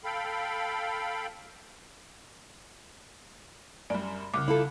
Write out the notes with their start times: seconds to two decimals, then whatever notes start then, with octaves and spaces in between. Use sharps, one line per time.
0.04 A4 F5 G5 B5
3.90 F#2 G3 D5
4.34 C2 C#3 D6
4.48 E4 F4 A4